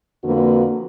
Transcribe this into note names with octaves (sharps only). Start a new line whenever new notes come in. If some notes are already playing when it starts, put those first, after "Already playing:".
F2 D3 A#3 F#4 B4